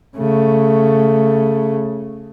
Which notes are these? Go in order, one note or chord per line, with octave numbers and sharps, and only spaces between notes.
C#3 A3